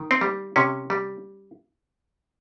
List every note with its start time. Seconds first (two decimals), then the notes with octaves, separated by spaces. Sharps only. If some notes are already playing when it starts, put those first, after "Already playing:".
Already playing: D#3
0.11 C4
0.21 G3
0.56 C3 C#4
0.90 G3